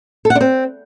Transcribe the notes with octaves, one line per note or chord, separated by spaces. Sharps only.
A4
F#5
D4
C4